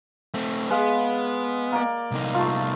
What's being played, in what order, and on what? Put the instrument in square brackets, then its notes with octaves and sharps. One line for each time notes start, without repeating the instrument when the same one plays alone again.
[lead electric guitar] A3 C4
[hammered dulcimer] G#3 F5 [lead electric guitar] B3
[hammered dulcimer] A#3 D5
[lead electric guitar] C2 D#4
[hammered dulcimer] A3 F4